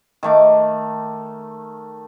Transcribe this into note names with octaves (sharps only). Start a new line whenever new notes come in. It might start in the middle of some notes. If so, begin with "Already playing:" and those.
D#3 A3 D6